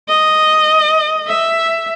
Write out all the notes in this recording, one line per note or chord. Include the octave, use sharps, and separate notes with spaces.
D#5
E5